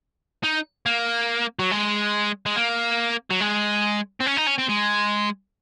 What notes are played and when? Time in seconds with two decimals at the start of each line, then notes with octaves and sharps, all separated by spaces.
0.43 D#4
0.86 A#3
1.59 F#3
1.71 G#3
2.46 G#3
2.56 A#3
3.31 F#3
3.41 G#3
4.20 C4
4.26 C#4
4.37 D#4
4.47 C#4
4.58 C4
4.69 G#3